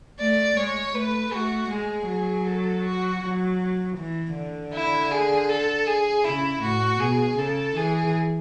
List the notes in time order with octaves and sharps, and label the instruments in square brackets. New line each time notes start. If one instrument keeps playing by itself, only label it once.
[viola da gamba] A3 [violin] D5
[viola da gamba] G#3 [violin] C#5
[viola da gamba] A3 [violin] B4
[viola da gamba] A3 [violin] F#4
[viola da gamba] G#3 [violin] G#4
[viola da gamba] F#3
[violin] A4
F#4
[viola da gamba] F#3
E3
D3
[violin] E4
G#4
A4
G#4
[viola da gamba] C#3 [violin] E4
[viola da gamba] A2 [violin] F#4
[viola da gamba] B2 [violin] G#4
[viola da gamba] C#3 [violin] A4
[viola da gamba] E3 [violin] G#4